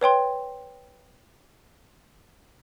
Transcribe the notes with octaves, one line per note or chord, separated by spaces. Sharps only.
B4 C#5 G5 C6